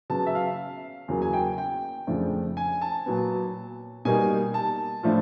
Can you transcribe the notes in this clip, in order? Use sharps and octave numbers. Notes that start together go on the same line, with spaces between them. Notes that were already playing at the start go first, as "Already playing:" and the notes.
C#3 F#3 B3 A5
E5
F5
E2 C#3 F#3 A#3
G#5
G5
G5
F2 C#3 F3 A3 D4
G#5
A5
A#2 F#3 B3
B2 G3 A#3 D#4 G#5
A5
A2 F3 A3 D4 F4